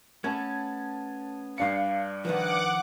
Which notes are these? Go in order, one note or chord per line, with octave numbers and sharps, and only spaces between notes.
A3 B3 C#4 A5 G#6
G2 D4 F5 C#7
D#3 F3 B4 F#5 D6